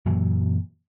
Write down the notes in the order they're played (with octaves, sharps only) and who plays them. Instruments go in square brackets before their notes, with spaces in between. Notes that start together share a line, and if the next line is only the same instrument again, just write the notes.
[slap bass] F#2 A#2 E3 F#3